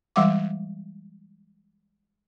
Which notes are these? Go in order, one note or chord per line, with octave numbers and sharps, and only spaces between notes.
E3 G3 G#3 F5 F#5 D6